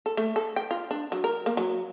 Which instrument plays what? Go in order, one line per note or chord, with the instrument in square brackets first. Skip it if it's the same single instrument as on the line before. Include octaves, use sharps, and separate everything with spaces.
[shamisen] A4
A3
A4
G5
F4
D4
F#3
A#4
A#3
F#3